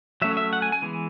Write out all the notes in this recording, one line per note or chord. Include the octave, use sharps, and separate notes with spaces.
F#3 A3 C#4 E5
E5
F#5
G#5
G#5
E3 G#3 B3